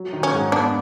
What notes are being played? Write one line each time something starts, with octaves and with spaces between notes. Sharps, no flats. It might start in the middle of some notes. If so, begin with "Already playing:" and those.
Already playing: F#3
D#3
C#4
G#2
B3 D4